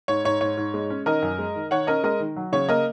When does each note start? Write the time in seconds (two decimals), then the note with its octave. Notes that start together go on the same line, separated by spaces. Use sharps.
0.08 G#2 C#5
0.24 G#2 C#5
0.41 G#2 C#5
0.57 G#2
0.74 G#3
0.90 C#4
1.06 D#3 A#4 D#5
1.22 F#2
1.38 G#3
1.55 D#3
1.71 D#3 C#5 F#5
1.87 C#4 A#4 D#5
2.03 G#3 A#4 D#5
2.20 D#3
2.36 F#3
2.52 C#3 C#5
2.69 A#3 A#4 D#5